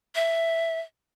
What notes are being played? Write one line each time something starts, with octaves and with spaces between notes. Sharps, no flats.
E5